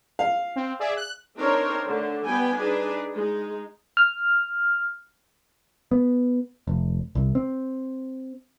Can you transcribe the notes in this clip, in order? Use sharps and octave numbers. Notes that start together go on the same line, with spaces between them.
F5
C4
G#4 D5 E5
F#6
C4 D4 D#4 A#4 C5 C#5
D3 A3
G3 B3 G5 G#5
D4 D#4 G#4 B4
G#3 D#4
F6
B3
F1
C2
C4